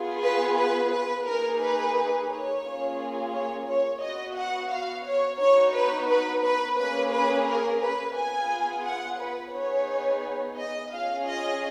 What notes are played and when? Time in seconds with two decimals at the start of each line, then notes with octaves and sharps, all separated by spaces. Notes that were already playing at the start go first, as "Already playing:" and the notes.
Already playing: B3 F4 G#4
0.21 B4
0.56 B4
0.90 B4
1.24 A#3 D#4 G#4 A#4
1.60 B4
2.28 C#5
2.63 A#3 C#4 F4 G#4
3.31 C#5
3.67 C#5
4.01 B3 F#4 D#5
4.36 F#5
4.70 F5
5.05 C#5
5.39 B3 D#4 F#4 C#5
5.74 B4
6.08 B4
6.43 B4
6.78 A#3 C#4 G#4 B4
7.12 B4
7.47 A#4
7.80 B4
8.15 B3 F4 G#4 G#5
8.84 F#5
9.20 B4
9.53 B3 D#4 G#4 C#5
10.57 D#5
10.92 C#4 F4 G#4 F5
11.27 D#5